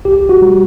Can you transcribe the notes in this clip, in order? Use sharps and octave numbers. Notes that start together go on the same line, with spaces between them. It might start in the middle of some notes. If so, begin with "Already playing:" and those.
C2 G4
F#4
G3